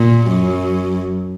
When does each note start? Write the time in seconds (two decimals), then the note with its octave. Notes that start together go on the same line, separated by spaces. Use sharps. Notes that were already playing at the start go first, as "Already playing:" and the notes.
Already playing: A#2
0.28 F#2